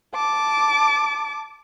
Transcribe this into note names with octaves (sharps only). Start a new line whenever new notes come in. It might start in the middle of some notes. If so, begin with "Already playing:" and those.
A5 D6